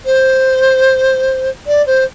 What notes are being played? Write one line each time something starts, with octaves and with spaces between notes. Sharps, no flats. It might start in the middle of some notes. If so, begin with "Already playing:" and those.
C5
D5
C5